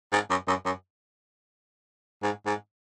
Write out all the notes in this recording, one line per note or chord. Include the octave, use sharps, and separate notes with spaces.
G#2
F#2
F#2
F#2
G#2
G#2